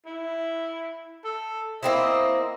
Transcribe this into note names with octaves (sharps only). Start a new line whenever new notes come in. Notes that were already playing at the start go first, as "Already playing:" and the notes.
E4
A4
A#3 C4 E4 D#5